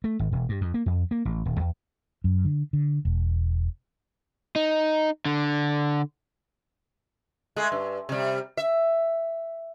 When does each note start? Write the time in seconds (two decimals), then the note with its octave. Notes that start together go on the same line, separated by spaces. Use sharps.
0.04 A3
0.19 G#1
0.32 E1
0.49 G2
0.61 F2
0.74 A#3
0.86 F2
1.11 A#3
1.25 A1
1.45 D#1
1.60 E2
2.24 F#2
2.45 D3
2.73 D3
3.05 E1
4.56 D#4
5.26 D3
7.56 G#3 A3 G#4
7.72 G2
8.09 C3 G3
8.57 E5